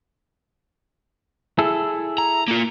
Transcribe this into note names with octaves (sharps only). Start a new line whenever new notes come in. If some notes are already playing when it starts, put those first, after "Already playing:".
E4 G#4 A4
A#5
A#3 F4